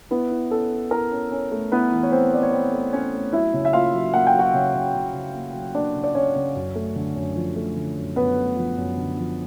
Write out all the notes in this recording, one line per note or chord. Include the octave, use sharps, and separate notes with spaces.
B3 E4 B4
E4
C#4 A4
C#4
E4 A#4
C#4
C#4
A3
B3 E4 B4
E3
C#5
A3 C4 C5
A3 D5
C#5
E3 C4 C5
A3
A3 C#4 C#5
A3
F#3 E4 E5
C#3
E5
A#3 F4 F5
F#3
A#3 F#5
G5
F#3
F#4 F#5
C#3
C#3
C#3
C#3
A#3
F#3
A#3 D4 D5
C#3
D5
C#3 C#4 C#5
C#3
F#2
A3
D3
F#2
F3
A3
D3
F#2
F#2 B3 B4
A3
F3
F#2
D3
F3